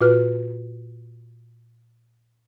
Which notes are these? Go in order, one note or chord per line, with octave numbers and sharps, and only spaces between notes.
A#2 F4 F#4 B4 F6 F#6